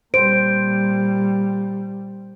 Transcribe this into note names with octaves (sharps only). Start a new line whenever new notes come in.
A#2 G3 C5 D7